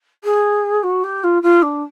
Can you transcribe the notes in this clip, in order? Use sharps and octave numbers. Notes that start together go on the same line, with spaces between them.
G#4
F#4
G4
F4
F4
D4